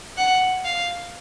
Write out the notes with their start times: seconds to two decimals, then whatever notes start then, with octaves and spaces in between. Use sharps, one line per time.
0.17 F#5
0.65 F5